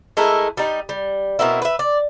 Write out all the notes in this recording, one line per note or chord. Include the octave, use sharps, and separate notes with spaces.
G#3 A3 E4 A#4
G3 D#4
G3
B2 A#3 C4 E4
B4 E5
D5